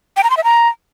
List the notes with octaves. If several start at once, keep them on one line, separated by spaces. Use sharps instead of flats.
G5
A#5
C6
E5
A#5